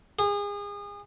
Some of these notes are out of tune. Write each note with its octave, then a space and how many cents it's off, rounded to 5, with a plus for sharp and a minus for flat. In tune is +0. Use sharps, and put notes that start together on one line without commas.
G#4 -30